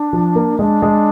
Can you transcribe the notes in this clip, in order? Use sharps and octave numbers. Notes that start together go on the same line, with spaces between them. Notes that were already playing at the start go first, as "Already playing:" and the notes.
Already playing: D4
F3
A#3
G#3 D4
G#3